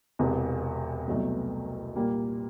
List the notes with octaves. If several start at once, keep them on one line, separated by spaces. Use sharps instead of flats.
E1 E2 C3
C2 B2 F#3 A3
A#2 G3 A#3